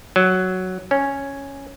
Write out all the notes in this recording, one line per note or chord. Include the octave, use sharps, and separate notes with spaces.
F#3
C#4